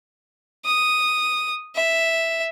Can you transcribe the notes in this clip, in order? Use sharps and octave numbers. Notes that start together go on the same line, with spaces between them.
D#6
E5